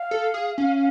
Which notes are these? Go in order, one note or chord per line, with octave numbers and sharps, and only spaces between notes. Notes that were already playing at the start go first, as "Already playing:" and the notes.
Already playing: F5
A4
G#4
C#4